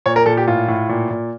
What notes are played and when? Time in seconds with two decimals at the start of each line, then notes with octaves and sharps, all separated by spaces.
0.06 A#2 C#5
0.16 A#4
0.26 A#2 A4
0.37 G4
0.47 A2 F4
0.68 A2
0.89 A#2
1.10 A#2